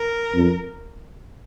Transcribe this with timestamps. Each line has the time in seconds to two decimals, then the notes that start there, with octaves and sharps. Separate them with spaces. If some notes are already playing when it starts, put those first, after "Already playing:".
Already playing: A#4
0.35 F2